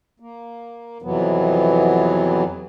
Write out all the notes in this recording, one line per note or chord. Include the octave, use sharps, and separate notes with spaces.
A#3
F2 C3 E3 F#3 B3